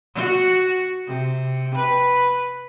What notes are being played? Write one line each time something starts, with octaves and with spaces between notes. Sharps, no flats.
F#4
C3
B4